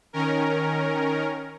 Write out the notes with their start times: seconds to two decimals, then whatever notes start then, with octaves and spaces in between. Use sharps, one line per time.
0.13 D#3 C#4 A#4